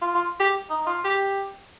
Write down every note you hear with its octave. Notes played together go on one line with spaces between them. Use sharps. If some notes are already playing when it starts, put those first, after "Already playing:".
F4
F4
G4
D#4
F4
G4